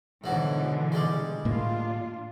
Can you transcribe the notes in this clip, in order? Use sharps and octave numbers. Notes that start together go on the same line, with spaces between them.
G#2 B2 D3 E3 F#3
G3 G#3
A2 A#3 D4 F4